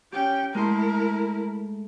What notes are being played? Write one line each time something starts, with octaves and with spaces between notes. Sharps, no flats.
C#4 G4 G5
G#3 A3 E4 A#4 C6